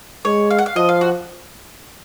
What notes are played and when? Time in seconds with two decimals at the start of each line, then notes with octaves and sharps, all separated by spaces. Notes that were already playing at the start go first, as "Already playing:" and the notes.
0.25 G#3 C#5
0.51 F5
0.59 F#5
0.66 F5
0.76 F3 D#5
0.89 F5
1.01 F#4